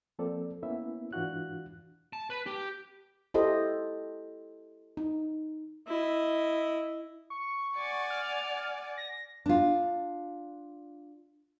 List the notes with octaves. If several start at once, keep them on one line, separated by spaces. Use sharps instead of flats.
F3 A#3 C4 A4 D5
A#3 B3 C#4 E4 E5
G#2 E3 D4 F4 F#4 F#6
A5
B4
G4
E4 G4 A4 C5 D#5
D#4
E4 D#5
C#6
D5 F#5 G#5
F6
A#6
D4 F4